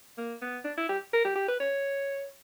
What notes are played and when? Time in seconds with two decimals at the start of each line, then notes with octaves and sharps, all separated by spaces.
0.18 A#3
0.41 B3
0.64 D4
0.77 E4
0.89 G4
1.13 A#4
1.25 G4
1.36 G4
1.48 B4
1.60 C#5